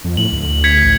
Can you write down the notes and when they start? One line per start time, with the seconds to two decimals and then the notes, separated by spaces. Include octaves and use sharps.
0.04 F2
0.17 A2 F#7
0.32 D2
0.64 G#6 B6 C#7
0.84 A1